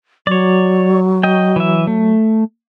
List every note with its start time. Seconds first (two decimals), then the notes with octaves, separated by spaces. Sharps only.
0.27 F#3 C#5 D5
1.23 D#5 G5
1.56 E3 E5
1.87 A3